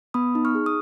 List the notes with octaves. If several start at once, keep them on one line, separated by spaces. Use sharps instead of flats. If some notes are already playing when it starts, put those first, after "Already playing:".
B3 B5 D#6
D#4
C#6 F6
G#4
D#6